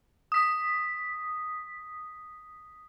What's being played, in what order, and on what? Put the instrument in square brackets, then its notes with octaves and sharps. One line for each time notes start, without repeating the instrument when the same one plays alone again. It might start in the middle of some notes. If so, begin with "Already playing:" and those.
[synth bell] D#6 B6